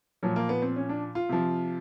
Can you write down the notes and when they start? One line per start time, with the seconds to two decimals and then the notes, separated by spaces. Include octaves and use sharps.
0.23 A#2 F3 F#3
0.36 A#3
0.49 B3
0.62 C4
0.76 C#4
0.89 D4
1.15 F4
1.29 C3 F3